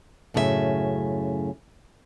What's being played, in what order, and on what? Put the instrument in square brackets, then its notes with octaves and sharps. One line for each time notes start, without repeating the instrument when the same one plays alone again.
[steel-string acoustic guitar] F#2 A2 C#3 D4 E5 G#5